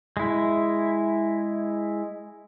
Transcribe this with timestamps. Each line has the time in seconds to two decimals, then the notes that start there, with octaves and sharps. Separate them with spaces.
0.17 G#3 E4